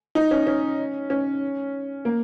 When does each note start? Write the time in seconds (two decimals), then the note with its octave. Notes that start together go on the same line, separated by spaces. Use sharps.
0.15 D#4
0.31 C#4
0.47 C#4
1.10 C#4
2.05 A#3